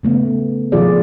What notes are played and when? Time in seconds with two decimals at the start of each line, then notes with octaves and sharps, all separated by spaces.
0.03 C#3 A3 B3
0.72 B2 D#3 F3 F4 G#4 D5